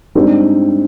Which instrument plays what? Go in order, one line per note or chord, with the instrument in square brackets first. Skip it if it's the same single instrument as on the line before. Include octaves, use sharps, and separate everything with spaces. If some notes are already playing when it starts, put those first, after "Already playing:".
[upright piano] G#2 G3 C4 D#4 [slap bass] D4